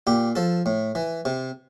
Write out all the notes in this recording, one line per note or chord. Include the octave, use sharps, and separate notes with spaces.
A#2 G4
F3 A4
A2
E3
C3